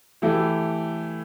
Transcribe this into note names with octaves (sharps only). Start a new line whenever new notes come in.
E3 A3 E4 G4